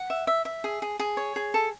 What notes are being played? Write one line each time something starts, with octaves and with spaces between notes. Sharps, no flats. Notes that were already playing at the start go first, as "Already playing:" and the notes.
Already playing: F#5
E5
E5
E5
G#4
G#4
G#4
C#5
G#4
A4